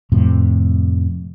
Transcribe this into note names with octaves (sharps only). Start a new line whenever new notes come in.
F2 A2 C3